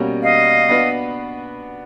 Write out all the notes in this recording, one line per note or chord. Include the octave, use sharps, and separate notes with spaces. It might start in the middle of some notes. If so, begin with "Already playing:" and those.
Already playing: B2 G3 A#3 C#4 F#4
D#5 F5
B3 D4 F#4 B4